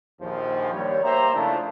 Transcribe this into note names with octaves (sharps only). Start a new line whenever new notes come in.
A#1 D#2 F3
D#2 G3 C#5
A#3 G4 C5 E5 A#5
C#3 F3 A3 D4 E4 F4